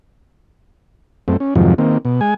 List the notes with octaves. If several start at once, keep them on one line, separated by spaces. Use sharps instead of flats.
F#2 A3 C4
C#4
F2 G#2 C3 D#3 F3 F#3
D#3 A#3 C4
B2
G#3 G#5